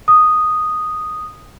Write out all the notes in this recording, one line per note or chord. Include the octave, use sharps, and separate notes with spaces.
D#6